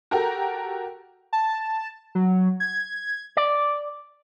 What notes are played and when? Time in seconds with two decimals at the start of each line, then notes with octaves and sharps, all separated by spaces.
0.11 F#4 G4 A4 A#4 G5 A#5
1.33 A5
2.15 F#3
2.60 G#6
3.37 D5